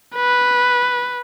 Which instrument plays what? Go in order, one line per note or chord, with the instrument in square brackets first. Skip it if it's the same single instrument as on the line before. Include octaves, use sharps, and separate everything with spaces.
[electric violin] B4